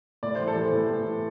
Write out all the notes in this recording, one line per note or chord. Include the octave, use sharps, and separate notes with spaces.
A2 D5
E3 C5
A4
E3 C5
A2
A2
E3